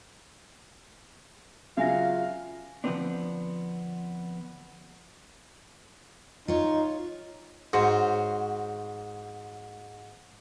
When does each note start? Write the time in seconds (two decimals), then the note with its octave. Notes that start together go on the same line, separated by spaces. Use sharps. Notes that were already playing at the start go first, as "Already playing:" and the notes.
1.77 C#3 F#3 F4 E5 F5 G#5 A#6
2.84 D3 F3 F#3 B3 C4 D4
6.48 D#4 F4 C#5
7.73 G#2 F#4 C5 C#5